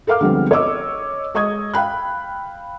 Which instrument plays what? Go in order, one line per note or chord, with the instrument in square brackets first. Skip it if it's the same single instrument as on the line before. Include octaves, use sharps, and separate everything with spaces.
[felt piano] A4 A#4 F5 D6 F6
D3 F3 G3 G#3 B3 C4
C#5 D#5 D6 E6
G#3 D#5 C#6 D#6 G#6
F5 G5 B5 F#6